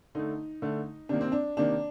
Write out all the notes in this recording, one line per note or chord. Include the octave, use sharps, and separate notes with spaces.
D3 A3 D#4
D3 A3
C3 D#3 A#3 D4
C4
D4
C3 D#3 A#3 D4